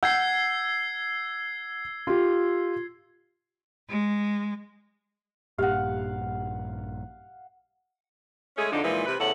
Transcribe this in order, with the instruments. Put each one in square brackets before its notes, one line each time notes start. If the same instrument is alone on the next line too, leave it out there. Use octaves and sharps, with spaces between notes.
[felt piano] F#5 G6 [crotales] E6 G#6 C7
[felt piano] F4 G4
[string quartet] G#3
[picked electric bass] A#1 G2 A#2 [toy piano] G4 [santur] F5 F#5
[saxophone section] G#3 A3 C#4 G#4
F2 D3 F3 D4 D#4
A#2 E3 F3 G#3 D#4
C3 B4
E2 C#3 A3 A4 F#5